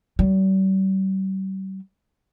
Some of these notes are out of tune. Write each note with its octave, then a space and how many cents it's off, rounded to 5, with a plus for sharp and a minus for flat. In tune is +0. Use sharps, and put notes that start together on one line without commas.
G3 -40